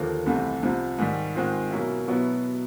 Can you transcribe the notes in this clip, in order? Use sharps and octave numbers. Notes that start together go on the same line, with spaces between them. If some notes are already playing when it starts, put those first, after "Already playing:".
Already playing: D#2 D3 F3 A#3
C2 C3 E3 A3
C2 C3 F3
G#2 D#3 G3
G#2 D#3 G#3 C4 F4
B2 F#3 A#3 C#4 E4
B2 F#3 B3 E4